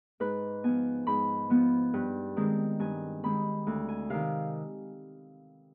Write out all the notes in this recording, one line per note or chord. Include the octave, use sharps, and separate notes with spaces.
G#2 B4
F3 B3 G#5
G#2 B5
F3 B3
G2
D#3 G#3 C4
G2 G#5
D#3 G#3 C4 B5
D2
G#5
C3 D#3 F5